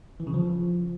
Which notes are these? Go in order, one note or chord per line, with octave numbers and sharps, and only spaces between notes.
E3
C#3
F3